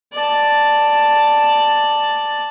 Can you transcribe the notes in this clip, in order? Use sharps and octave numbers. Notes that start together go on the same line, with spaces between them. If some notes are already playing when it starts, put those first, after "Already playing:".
D5 A5